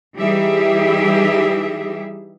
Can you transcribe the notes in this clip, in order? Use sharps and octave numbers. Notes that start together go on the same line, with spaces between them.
E3 G3 D#4 G4 G#4 E5